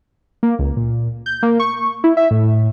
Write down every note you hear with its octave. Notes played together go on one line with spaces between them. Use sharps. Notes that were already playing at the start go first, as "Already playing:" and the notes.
A#3
C#2
A#2
G6
A#3
C#6
E4
E5
A2